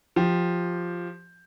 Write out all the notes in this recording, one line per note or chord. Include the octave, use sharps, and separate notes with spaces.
F3 G4